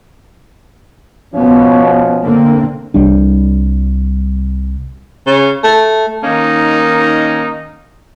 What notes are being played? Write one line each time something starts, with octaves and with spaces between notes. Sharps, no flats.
B2 F3 B3 C#4
D3 A#3 C4
C2 G3 D4
C#3
A3
D#3 A#3 C#4 D#4